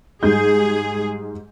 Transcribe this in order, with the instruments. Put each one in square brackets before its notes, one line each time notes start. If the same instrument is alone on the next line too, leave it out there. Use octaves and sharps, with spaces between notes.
[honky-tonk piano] G#2 G3 G6 [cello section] G#4